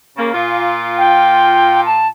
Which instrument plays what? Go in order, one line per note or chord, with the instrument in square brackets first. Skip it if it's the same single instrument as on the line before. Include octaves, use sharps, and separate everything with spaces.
[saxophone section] C#3 A#3
A#2 F4
[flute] G5
A5